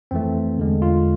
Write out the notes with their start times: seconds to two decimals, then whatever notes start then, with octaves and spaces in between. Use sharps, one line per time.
0.11 F2 E3 A3 C4
0.58 E2 D3 G#3
0.82 F4